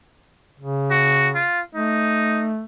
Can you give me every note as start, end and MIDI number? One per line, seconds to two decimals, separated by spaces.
0.60 1.44 49
0.91 1.29 66
1.35 1.61 65
1.75 2.63 57
1.75 2.51 63